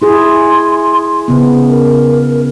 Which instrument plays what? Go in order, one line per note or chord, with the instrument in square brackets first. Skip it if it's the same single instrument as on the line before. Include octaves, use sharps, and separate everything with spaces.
[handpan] E4 G#4 [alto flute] C6
[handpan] C#3 B3
[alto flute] A#4